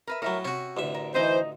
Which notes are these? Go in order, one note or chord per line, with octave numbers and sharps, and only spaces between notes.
A#4 B4 E5
A2 F#3 A#4 E5 A#5
C3 C#4 F#4
A1 D2 E5
A#4
E3 D#4 C5 D#5